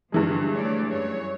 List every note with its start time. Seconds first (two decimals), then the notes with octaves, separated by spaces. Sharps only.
0.12 G2 D3 E3 F3 G#3
0.51 A3 C#5 D5
0.89 F#2 C#5